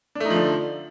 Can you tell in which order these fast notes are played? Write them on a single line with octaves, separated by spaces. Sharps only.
D4 A3 D#4 F3 D3